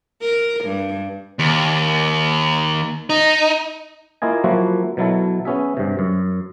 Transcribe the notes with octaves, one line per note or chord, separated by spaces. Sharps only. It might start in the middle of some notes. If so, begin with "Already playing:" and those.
A#4
G2
D#2
D#4
A#3 E4 F4 D#5 G#5
F3 F#3 A#3 E4 F#4
B2 F#3 E4 A4
B3 C#4 G#4 E5
G2 C3
F#2